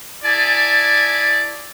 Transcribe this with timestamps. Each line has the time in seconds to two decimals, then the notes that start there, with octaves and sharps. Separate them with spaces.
0.24 E4 G#4 D5 G#5 A5